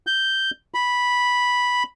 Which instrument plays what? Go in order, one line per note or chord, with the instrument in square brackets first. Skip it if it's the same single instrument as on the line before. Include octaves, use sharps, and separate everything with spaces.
[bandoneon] G6
B5